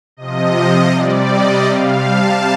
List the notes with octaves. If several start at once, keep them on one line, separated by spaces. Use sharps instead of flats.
C3 F3 D#5
C3 G3 D5
D#5
C3 G3 F5
A5